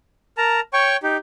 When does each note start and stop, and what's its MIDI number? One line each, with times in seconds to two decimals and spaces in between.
0.38 0.60 70
0.38 0.60 81
0.38 0.60 82
0.73 0.97 73
0.73 0.97 79
0.73 0.97 85
1.03 1.17 63
1.03 1.17 67